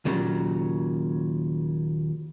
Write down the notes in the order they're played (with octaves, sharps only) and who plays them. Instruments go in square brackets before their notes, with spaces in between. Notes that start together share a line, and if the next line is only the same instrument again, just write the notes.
[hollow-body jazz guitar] D#2 A#2 C#3 F#3